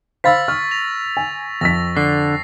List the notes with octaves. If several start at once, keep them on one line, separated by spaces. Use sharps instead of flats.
C5 F5 B5 E6 A6 B6
C#6 F6
A#6 F7
G#5
F2 E6 A#6 B6
D3 C7